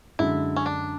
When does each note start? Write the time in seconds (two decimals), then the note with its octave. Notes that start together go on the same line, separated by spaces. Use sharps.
0.19 F#2 D3 G#3 E4
0.56 C#4
0.66 D4